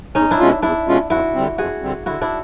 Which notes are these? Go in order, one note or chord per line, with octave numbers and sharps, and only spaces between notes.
E2 C#4 D#4
D4 E4
B2 G#3 C#4 F4
E2 D4 E4
B2 G#3 C#4 F4
F2 E4 F#4
D3 G3 C4
F2 F#4 G#4
D3 G3 C4
D3 E4 F#4
D4 E4